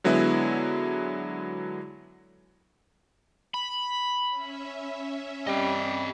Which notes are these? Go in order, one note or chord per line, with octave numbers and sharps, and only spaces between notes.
D3 F#3 G#3 B3 E4
B5
C#4 E5
G3 C4 D#5